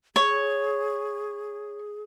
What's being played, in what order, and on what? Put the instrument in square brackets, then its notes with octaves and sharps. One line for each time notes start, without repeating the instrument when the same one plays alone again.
[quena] G#4 [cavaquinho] C#5